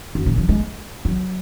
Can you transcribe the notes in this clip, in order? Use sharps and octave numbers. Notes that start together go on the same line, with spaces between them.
F#2
A#2
F#3
G#3
F#3